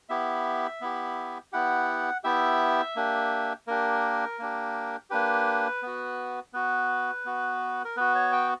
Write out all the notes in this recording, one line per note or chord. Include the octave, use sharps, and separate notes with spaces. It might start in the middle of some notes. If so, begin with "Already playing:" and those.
B3 E4 G4 E5
B3 E4 G4
B3 E4 G4 F#5
B3 E4 G4 E5
A#3 D4 G4
A#3 D4 G4 A#4
A#3 D4 G4
A#3 D4 G4 B4
B3 F#4
B3 F#4 B4
B3 F#4
A#4
B3 F#4 B4
C#5
G5